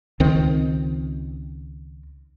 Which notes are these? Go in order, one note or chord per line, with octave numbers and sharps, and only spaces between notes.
C#2 D#3 C4